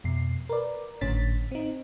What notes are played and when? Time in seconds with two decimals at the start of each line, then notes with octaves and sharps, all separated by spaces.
0.04 F2 B2 C7
0.49 A#4 B4 D5
1.01 G#1 A2 D3 C#4 A6 B6
1.51 C4 D#4